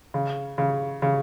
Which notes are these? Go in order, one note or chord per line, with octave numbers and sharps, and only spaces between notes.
C#3
C#3
C#3